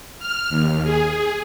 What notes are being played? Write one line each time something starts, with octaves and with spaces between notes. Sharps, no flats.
F6
D#2
G#4